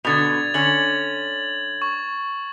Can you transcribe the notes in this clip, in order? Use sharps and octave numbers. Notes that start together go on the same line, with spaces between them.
B2 D3 G#6 A6 F7
D3 C#4 G#6 F#7
C#6